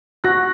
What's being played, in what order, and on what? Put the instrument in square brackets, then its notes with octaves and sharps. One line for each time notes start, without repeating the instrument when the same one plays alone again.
[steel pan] F#4 [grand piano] F#6 A#6